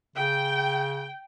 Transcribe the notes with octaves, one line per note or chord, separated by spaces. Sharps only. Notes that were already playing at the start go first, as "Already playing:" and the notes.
C#3 G5